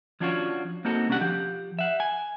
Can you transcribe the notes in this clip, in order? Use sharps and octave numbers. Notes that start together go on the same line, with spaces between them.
F3 C#4 D4 F4 F#4 C#5
A#3 C4 D#4 F#4 A4
C2 C#4 D4 G4 F#5
F3 G4
E5 F#5
G#5